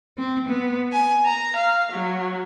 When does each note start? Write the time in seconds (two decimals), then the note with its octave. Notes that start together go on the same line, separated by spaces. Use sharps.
0.18 C4
0.48 B3
0.92 G#5
1.25 A#5
1.55 F5
1.93 F#3